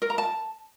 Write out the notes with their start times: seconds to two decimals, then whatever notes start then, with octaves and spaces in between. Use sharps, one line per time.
0.02 A#4
0.10 A#5
0.18 A5